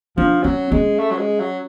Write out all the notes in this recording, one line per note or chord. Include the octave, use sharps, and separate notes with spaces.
F3 D4
F#3 C#4
G#3 C#4
A3
F#3
G#3
F#3